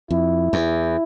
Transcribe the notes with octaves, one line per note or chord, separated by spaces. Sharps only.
F2 E4
E2